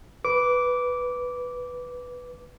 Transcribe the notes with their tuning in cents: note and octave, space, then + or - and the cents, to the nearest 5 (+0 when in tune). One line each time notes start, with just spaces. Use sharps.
B4 +0 D6 -15